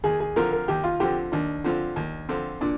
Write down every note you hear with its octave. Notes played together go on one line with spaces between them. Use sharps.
D#2 G#4
G#4
D3 F3 C4 F4 A#4
A#4
D#2 G4
F4
D3 F3 C4 F4 G4
D#2 D4
D3 F3 C4 F4
D#2
D3 F3 C4 F4
A#2 D4